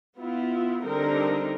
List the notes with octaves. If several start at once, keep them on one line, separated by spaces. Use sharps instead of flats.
B3 E4 F4
D3 G3 C4 D#4 A#4